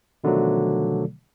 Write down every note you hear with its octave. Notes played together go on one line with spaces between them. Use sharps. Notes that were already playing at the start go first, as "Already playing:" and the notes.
B2 D3 D#3 F3 F#3 A3